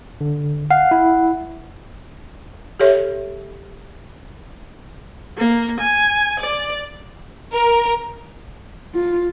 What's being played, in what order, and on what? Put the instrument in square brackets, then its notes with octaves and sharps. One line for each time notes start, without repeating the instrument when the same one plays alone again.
[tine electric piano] D3
[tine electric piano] F5 [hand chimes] F#5
[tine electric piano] E4
[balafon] G4 A4 C#5 E5
[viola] A#3
G#5
D5
[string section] A#4
[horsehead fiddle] F4